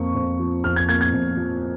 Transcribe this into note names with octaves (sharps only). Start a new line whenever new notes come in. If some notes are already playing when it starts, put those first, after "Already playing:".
Already playing: F2 A#3 C#6
F2
F3
F2 F6
G#6
A#3 G#6
G#6
F2
F3